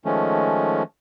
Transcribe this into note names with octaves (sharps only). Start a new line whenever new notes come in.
D#3 F3 G#3 A3 C#4